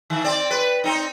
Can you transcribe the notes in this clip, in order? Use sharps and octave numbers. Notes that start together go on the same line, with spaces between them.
D#3
C4 D5
B4
C4 D#4